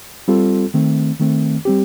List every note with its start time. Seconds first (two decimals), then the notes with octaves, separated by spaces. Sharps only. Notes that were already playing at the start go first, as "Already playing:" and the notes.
0.28 G3 C4 F4 A4
0.74 D#3 A3 C4
1.20 D#3 A3 C4
1.65 G3 C4 G4